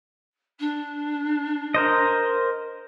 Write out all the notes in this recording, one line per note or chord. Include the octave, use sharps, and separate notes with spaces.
D4
A#4 C5 D#5